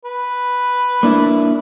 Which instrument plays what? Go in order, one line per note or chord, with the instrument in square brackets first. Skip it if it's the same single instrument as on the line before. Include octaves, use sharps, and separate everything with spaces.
[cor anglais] B4
[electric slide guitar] A#3 D4 E4